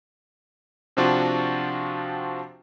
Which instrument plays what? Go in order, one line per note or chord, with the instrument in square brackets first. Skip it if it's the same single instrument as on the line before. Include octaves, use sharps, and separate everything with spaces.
[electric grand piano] C3 F3 C4 D4 F4 F#4